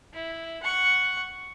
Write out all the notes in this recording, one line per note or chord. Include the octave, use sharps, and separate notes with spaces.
E4
F#5 C#6